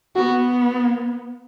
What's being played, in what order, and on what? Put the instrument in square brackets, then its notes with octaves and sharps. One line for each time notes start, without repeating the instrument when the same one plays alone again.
[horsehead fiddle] B3 [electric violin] F#4